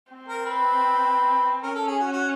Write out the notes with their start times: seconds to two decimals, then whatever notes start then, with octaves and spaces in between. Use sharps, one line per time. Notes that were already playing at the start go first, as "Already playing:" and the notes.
0.12 C4
0.28 A#4
0.45 B4
1.62 C#4 A#4
1.75 A4
1.88 G#4
2.00 F#4
2.12 F#4